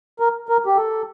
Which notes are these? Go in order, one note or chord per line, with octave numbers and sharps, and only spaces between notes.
A#4
A#4
G4
A4